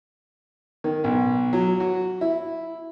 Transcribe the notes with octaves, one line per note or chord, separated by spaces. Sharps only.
D#3
B1
F#3
F#4
E4